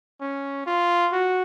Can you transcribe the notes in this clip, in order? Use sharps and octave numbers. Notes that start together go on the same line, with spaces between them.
C#4
F4
F#4